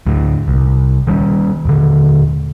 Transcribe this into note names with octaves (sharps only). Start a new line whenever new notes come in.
D2 A2
C2
D#3 G3 A#3 C#4
D#1 D3